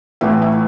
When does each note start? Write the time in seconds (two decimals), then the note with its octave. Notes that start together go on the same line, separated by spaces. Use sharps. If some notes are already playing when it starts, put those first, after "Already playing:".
0.21 A1 A2 E3 E5
0.42 E5